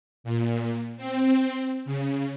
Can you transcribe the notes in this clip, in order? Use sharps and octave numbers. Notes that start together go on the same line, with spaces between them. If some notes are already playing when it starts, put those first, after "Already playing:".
A#2
C4
C#3